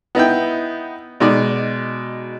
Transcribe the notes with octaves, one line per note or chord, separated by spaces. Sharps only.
B3 D#4 E4 G5
B2 G#3 D#4 D5